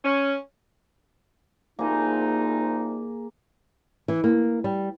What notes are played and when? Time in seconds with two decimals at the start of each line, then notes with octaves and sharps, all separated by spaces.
0.04 C#4
1.79 C2 F3 A#3 D#4 G#4
4.08 E3
4.24 A#3
4.64 G3